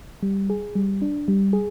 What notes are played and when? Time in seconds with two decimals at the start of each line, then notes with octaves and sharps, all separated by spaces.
0.23 G3
0.50 G#4
0.75 G3
1.02 D4
1.28 G3
1.53 G#4